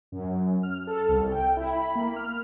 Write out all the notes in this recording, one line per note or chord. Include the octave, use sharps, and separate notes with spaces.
F#2
F6
A4
C2
G5
E4
B5
A#3
F6